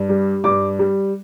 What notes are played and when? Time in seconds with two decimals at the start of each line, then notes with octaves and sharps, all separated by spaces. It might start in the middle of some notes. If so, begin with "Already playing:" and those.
Already playing: G2
0.09 G3
0.44 G2 D6
0.79 G3